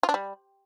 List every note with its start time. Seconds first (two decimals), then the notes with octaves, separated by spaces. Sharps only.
0.03 F4
0.09 D4
0.14 G3